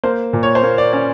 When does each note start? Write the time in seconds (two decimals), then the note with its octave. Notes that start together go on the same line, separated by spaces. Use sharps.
0.03 A#3 C5
0.33 A#2
0.43 C#5
0.55 C5
0.63 A#3 C#5
0.78 D5
0.93 C#4 D5